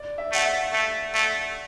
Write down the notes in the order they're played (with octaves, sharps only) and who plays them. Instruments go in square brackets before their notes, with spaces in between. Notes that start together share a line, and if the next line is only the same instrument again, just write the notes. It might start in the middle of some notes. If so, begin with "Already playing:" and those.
Already playing: [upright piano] D5
E5
[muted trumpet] A3 [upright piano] F#5
[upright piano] E5
[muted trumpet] A3
A3